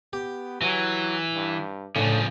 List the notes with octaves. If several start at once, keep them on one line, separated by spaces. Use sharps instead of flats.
B3 G4
E3 F#3
G2
A2 C#3 F3 D4